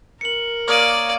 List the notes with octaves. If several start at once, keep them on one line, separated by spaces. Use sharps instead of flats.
A#4 C#7 F#7
A#3 C#5 D5 F5 D6 D#6 D#7